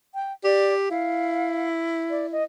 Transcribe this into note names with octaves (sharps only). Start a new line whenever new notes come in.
G5
G4 D5
E4 F5
D5
D#5